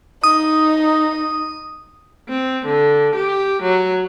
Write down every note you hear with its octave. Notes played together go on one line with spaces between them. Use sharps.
D#4 D#6
C4
D3
G4
F#3